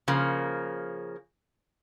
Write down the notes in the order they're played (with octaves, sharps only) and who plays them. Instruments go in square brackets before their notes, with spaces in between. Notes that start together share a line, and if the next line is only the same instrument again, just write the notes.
[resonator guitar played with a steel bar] C#3 F3 A#3